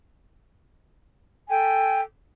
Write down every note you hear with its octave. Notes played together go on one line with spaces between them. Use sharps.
A4 G5 G#5